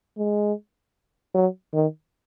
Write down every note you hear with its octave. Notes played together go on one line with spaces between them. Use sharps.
G#3
F#3
D#3